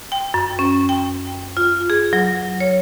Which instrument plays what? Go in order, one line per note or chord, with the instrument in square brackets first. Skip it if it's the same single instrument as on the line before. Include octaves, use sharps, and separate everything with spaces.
[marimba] G5
F#2
C#4
G5
F4
G#4
F#3
C#5